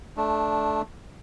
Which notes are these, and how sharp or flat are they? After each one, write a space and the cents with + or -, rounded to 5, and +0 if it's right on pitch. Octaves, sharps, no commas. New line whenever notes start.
A3 -15 D4 +0